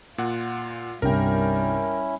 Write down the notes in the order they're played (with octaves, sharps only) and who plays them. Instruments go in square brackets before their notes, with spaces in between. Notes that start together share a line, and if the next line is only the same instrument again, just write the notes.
[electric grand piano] A#2 F#5 [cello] F4
[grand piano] C2 G2 [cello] G3 [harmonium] C#4 E4 [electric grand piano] A#4 G5